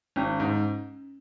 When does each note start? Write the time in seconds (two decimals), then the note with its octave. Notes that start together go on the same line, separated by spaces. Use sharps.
0.16 G#1 C#4
0.40 G#2